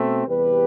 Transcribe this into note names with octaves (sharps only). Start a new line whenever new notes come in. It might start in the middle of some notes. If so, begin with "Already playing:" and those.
Already playing: B2 A3 C4
E2 C3 G3 G4 B4